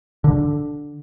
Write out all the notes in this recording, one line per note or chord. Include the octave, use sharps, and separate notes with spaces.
D3